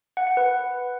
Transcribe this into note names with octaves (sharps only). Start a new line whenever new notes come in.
F#5
F#5
B4